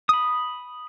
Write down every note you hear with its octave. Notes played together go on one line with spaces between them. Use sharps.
B5 D#6